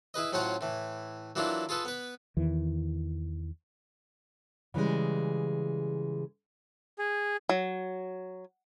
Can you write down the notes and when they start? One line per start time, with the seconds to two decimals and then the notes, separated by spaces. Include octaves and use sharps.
0.14 E4 G#4 B4 D#5
0.32 A2 F#3 C#4 F4 C5 F#5
0.61 A2 E3
1.36 E3 F#3 A#3 D4 E4 F4
1.69 F4 G#4 A4 B4
1.85 B3 B4
2.37 E2 D#3 E3
4.74 C#3 E3 G3 G#3
6.99 G#4
7.49 F#3